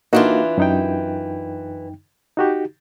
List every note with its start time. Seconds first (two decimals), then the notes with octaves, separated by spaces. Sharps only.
0.13 E3 A#3 D4 D#4 F4 F#4
0.58 F#2 D#4 G5
2.37 D#4 F#4 G4